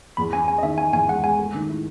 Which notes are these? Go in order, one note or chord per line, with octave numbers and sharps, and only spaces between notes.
E2 B5
C#4 G#5
C#4 G#5
D#5
D#3 E5
C#4 G#5
E2 G#5
G#3 F#5
G#3 G#5
A3
D#3
E4